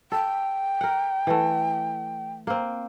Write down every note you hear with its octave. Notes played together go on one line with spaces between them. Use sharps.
A4 G5
A#4 F#5
E3 A3
A#3 C4